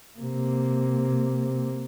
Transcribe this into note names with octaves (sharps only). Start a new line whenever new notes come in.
C3 A#3